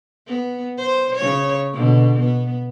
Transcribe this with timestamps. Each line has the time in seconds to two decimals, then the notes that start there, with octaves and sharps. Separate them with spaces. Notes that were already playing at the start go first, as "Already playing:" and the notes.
0.27 B3
0.78 C5
1.16 C#3 C#5
1.73 B2 D3
2.20 B3